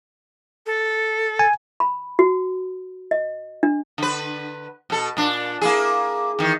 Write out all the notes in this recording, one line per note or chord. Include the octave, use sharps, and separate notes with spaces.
A4
G#5
B5
F#4
D#5
D4
D3 B4
B2 A4
A#2 D4
A#3 E4 G#4
E2 D#3